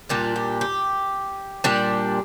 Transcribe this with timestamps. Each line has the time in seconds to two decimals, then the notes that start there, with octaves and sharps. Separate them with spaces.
0.09 A#2 G3 D4 F4
0.36 G4
0.61 G4
1.64 A#2 G3 D4